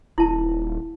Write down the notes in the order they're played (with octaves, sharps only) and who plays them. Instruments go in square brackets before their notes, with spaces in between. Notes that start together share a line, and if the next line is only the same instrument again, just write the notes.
[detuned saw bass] D#1 [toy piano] E4 A5